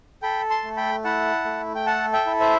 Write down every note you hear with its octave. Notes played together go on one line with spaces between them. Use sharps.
A4 G5 B5
A5 C6
A3
G5 B5
E4 F#5 A5
A3
G5
A4 F#5 A5
E5 G5
E4
C5 E5